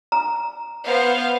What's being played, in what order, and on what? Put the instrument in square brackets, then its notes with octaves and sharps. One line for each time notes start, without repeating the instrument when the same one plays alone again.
[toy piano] A#5
[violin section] B3 C5 F5